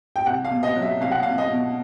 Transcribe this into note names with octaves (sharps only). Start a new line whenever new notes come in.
G5
C2 F#5
F5
B2
D#5
F#3
E5
C2 F5
F#5
C2 F5
D#5
B2